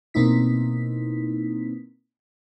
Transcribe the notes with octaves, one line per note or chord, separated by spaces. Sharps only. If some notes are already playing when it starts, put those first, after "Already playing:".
B2 A#3 C4 D#4 E4 B6